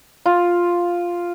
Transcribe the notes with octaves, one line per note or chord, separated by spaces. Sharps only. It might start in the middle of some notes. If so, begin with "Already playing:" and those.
F4